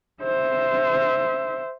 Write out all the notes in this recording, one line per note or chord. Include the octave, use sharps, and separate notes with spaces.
C5 E5